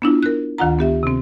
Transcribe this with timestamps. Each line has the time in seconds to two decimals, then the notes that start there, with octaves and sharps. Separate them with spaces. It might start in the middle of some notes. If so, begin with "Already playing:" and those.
0.02 B3 D4 E4 F4
0.23 A#4 F#6
0.58 D2 D#3 F4 F#5 A#5
0.79 B3 G4 E5
1.03 C3 C4